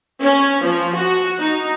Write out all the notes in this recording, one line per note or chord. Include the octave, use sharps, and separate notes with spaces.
C#4
F3
F#4
D#4